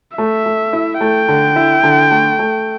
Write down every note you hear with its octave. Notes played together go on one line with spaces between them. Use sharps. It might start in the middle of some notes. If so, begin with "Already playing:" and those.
A3 E5
A3
E4
A3 G5
D3
E4
D3
A3
A3